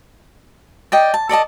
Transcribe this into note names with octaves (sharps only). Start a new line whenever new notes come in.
D5 D#5 G5
A5
A4 D5 D#5 A5